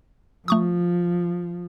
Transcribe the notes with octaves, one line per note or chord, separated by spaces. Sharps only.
F3 A3 C#6 D#6